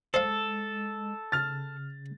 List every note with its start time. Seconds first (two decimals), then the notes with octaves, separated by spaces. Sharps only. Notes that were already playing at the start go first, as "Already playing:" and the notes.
0.14 G#3 A4 C5 D#5 F5
1.32 C#3 F6 A6